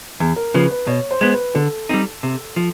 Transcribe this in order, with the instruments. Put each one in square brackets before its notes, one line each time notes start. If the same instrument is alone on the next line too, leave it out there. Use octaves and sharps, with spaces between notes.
[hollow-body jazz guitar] E2
[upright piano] A#4
[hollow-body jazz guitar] C#3 F3 [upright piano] B4
[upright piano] B4
[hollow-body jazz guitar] B2 [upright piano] C#5
[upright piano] C5
[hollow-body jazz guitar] G#3 B3
[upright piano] B4
[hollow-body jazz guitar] D3 [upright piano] A4
[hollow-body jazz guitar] G3 C4 D#4
C3
F3